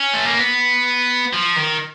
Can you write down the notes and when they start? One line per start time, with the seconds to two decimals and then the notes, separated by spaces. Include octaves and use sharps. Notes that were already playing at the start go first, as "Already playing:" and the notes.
Already playing: C#4
0.14 A3
0.25 A#3
0.38 B3
1.34 F3
1.57 D#3